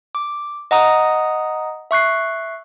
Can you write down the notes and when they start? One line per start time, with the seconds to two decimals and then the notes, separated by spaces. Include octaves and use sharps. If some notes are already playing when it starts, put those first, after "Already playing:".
0.15 D6
0.71 D#5 F#5 A#5 D#6
1.91 E5 C#6 F#6 C7